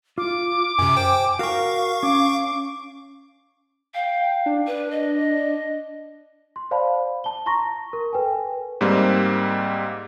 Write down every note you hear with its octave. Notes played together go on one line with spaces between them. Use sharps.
F4 D6
F#2 C3 G#5
C5 G5
F#4 A#4 F5 C#6
C#4 D6
F5 G5
D4
B4
D#5
C6
C5 D5 F5 A5 B5
A5 G7
A5 A#5 C6 C#6 A#6
A#4
A4 B4 G5 G#5
G#2 G3 A#3 C4